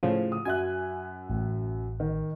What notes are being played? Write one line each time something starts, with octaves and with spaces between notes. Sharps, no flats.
A2 C#3 F3
D#6
F#2 E5 G#5 F#6
A1
D#3